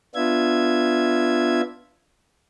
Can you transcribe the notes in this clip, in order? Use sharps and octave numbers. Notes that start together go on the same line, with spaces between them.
B3 D4 F4 E5 G#6